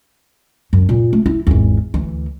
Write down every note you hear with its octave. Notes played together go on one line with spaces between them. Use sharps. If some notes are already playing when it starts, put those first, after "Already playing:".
F#2
A#2
A3
E4
G#1 E2
D2 E3